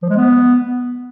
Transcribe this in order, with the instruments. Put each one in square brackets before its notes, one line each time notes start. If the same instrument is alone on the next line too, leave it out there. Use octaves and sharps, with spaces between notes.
[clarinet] F3
G#3
B3